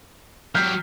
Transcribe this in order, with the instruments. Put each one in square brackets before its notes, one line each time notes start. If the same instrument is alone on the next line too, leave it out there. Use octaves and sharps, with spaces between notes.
[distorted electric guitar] F#3 G4 [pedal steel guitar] F6 [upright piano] G6 B6 C7